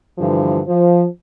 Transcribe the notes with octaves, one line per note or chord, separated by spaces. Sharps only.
G2 D3 E3 F3
F3